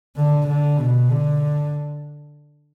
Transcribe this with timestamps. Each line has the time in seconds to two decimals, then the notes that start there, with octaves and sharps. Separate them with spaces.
0.17 D3
0.48 D3
0.79 B2
1.11 D3